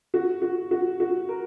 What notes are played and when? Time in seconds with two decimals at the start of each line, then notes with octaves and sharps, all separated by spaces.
0.14 F#4
0.42 F#4
0.71 F#4
1.00 F#4
1.29 A#4